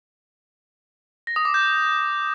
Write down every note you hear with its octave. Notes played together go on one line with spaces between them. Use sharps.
A#6
D#6
D6
G6